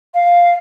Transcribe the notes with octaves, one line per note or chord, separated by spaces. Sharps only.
F5